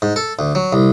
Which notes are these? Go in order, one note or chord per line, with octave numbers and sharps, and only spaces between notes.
G#2
A4
D2
F#3
C2